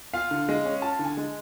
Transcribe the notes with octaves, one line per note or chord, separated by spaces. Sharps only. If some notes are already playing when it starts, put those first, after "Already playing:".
F4 F5
D3
G#3
C#4
F4 A5
D3
G#5
G#3